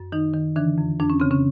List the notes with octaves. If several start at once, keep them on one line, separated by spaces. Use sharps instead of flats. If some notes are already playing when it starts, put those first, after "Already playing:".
Already playing: F#2
D#3 D#4
D#3
D3 E3 D4
F2
F2 D4
C#4
C#3 C4
C#3 C#4